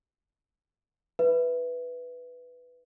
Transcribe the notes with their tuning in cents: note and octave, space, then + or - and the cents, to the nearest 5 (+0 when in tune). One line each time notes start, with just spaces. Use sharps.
D#4 +35 B4 +0 E5 +5